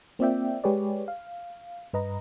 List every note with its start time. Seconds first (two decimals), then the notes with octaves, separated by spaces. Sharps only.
0.19 A#3 C4 F4 D5 E5 G5
0.64 G#3 G4 G#4 B4 C#5 D5
1.08 F5
1.93 G2 B4 D#5 A#5